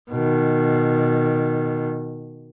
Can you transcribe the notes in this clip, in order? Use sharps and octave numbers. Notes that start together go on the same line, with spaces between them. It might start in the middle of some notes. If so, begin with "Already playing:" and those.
B2 D#3